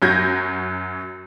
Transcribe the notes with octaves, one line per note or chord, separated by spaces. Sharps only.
F#2 F#3 G6 G#6 A#6